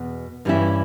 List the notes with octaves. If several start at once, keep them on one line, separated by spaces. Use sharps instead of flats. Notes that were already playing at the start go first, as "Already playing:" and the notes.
Already playing: E2 B2
G2 E3 G3 C#4 E4